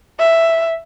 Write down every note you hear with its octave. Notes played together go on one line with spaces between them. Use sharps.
E5